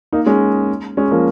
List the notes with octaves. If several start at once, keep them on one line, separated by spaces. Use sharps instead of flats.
A#3 D#4
G#3 C#4
G#3 C#4
F3 A#3